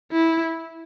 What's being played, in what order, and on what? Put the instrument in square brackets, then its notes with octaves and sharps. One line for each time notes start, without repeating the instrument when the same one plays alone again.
[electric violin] E4